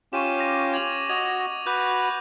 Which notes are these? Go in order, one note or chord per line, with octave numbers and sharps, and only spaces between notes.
C#4 F4 G4 C#6 D#7 E7
D6 A#6 D#7
G#6 F7 F#7
F#4 D#5 G#6 F7
F#4 B4 D6 F#6 G6